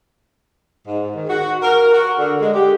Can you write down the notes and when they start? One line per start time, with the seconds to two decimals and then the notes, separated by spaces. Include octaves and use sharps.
0.86 G#2
1.15 D#3
1.29 F#4
1.63 A#4
1.93 F#4
2.18 D3
2.40 G#3
2.53 G4